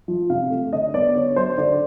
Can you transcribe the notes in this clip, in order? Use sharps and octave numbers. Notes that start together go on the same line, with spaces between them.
F3
C3 F5
A3
D3 D#5
B3 D5
D3 C#5
F#3 C5
D3 D5